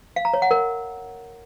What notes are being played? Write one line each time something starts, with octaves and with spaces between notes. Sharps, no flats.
F5
A#5
C#5
F#5
A#4